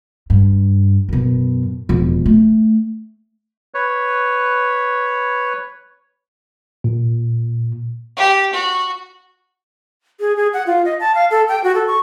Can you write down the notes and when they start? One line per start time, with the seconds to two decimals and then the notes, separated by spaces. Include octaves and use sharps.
0.30 G2
1.09 F#2 B2
1.89 E1 F2
2.26 A3
3.74 B4 C#5
6.84 A#2
8.17 G4
8.53 F#4
10.20 G#4
10.37 G#4
10.53 F#5
10.67 F4
10.85 D#5
11.00 A5
11.15 F5
11.31 A4
11.48 G5
11.64 F#4
11.75 A4
11.87 C#6